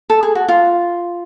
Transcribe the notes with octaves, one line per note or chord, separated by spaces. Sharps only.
A4
G#4
F#4
F4